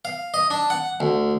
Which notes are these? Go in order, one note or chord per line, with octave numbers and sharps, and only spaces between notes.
F5
D#5
D4
F#5
D2